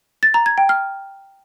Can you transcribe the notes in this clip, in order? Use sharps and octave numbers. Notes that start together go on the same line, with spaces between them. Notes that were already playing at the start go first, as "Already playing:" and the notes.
A6
A#5
G#6
G5
F6